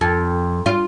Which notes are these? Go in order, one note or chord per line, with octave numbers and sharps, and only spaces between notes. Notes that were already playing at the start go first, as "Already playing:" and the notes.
F2
F4